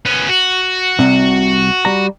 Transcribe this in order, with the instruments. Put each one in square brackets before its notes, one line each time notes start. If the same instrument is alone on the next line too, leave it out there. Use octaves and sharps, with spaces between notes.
[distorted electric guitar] B3 C#4
F#4
[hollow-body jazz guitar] C2 C3
G3 A#5